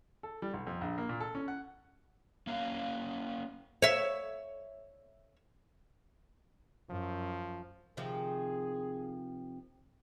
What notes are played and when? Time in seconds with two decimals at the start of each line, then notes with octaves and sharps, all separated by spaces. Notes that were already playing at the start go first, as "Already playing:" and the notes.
0.23 A4
0.42 G3
0.54 B1
0.67 F2
0.81 A#1
0.98 A#3
1.09 A#2
1.20 A4
1.35 C#4
1.48 F#5
2.47 A#3 C#4 F5
3.82 C#5 E5
6.90 F#2 F3
7.97 C3 D#3 F3 G#4